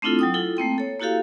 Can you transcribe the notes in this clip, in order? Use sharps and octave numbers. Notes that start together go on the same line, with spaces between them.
A3 C4 D4 E4 F4 A4
F#3 G5 D#6
E4 F4 A4
A3 A#3 C4 G5
A4 C#5
A#3 E4 F#4 G4 A4 F5